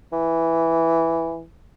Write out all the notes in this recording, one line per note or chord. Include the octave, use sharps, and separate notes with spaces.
E3